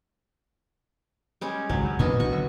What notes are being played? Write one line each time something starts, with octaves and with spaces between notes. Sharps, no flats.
G3 G#3 C#4
G#1 C#2 F#3
F#2
A#2 A#3 B3 D4 D#5 C#6
C2 D#3 F#4 C#6
D3 F#3